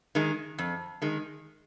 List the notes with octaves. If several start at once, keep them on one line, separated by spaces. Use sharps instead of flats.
D#3 G#3
F2
D#3 G#3